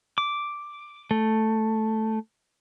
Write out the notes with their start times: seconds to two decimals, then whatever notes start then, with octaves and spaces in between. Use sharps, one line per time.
0.18 D6
1.11 A3